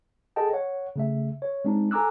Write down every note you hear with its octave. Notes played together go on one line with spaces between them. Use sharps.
G#4 A4 D#5 G5 A5
C#5 F#5
C#3 A3 E5
C#5
G#3 C4 D4 D#4
A4 G#5 A#5 D6 E6 F#6